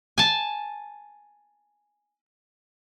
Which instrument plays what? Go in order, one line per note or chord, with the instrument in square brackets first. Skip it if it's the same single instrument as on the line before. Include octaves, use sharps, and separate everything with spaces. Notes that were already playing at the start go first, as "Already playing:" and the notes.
[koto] G#5 A5